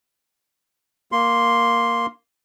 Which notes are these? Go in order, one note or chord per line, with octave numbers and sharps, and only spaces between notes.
A#3 C6